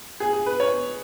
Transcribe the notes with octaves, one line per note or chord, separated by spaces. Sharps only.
G#4
G#4
B4
C#5